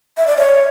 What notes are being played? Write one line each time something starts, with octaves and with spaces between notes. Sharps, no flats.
E5
D5
C#5